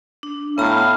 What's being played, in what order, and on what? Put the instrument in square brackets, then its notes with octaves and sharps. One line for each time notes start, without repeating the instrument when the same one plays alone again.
[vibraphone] D4
[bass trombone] A2 [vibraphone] B3 A#5 [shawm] F5